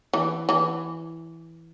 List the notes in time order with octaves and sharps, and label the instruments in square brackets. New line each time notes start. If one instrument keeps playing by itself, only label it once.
[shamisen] E3
E3